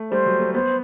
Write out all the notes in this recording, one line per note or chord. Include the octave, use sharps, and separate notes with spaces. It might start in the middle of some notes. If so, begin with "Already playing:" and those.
Already playing: A3
G3 C5
F#3
A3
B3 C5